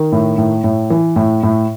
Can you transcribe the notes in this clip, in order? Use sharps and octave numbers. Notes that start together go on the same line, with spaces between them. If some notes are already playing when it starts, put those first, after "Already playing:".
Already playing: D#3
A2
A2
A2
E3
A2
A2